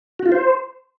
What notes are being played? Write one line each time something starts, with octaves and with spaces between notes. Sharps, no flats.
F#4
F4
C5